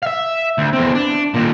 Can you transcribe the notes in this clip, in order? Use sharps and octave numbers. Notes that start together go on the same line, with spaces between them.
E5 F5
D2
E2 C4
D4
D#2 A#2